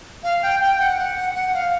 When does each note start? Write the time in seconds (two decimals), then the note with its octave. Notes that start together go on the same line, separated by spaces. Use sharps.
0.23 F5
0.43 G5
0.61 G5
0.80 F#5
0.99 F#5
1.17 F#5
1.35 F#5
1.54 F5